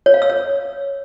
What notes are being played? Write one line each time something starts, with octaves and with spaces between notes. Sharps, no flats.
C#5
F5
E6
C#5